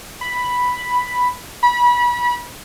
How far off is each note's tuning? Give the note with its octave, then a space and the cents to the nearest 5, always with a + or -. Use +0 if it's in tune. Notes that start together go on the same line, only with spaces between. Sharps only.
B5 +0
B5 -30